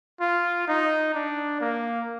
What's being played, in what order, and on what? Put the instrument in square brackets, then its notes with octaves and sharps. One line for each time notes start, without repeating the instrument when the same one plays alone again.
[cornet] F4
D#4
D4
A#3